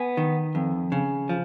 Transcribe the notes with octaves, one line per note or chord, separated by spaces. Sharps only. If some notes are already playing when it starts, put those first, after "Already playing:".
Already playing: B3 G#5
D#3
F2
C#3
F3